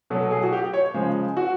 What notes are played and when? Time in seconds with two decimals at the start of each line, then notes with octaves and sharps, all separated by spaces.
0.10 B2 F#3 A3 A4
0.31 G#4
0.43 F#4
0.53 G4
0.73 C#5
0.94 C#3 F3 G#3 C5
1.37 F#4